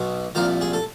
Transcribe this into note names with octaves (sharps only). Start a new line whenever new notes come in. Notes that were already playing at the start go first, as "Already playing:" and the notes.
Already playing: B1 B2
C2 A#2 F3 A#4
G#4
A4